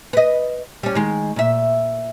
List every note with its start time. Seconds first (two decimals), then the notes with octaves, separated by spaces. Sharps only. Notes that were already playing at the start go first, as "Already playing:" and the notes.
0.13 B4 D#5
0.83 G3 C#4
0.95 D#3 G#3
1.36 A#2 E5